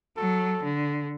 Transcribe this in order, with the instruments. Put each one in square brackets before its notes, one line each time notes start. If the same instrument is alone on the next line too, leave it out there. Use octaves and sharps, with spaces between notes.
[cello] F#3 [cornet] A4
[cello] D3